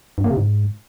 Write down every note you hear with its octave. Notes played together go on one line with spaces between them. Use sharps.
G2
A#3
C3
G#2